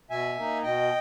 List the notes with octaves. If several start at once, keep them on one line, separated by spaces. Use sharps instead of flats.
B2 E5 G#5
A#3 D#4
B2 D#5 G5